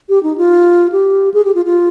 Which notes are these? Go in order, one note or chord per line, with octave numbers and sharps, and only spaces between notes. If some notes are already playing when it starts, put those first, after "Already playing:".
G4
D#4
F4
G4
G#4
G4
F4
F4